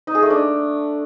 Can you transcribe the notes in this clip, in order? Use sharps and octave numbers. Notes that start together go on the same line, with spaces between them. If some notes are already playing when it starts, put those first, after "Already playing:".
D#4
G#4
A3
D4